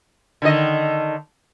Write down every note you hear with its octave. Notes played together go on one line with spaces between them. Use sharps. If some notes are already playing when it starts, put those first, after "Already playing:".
D3 D#3 D#5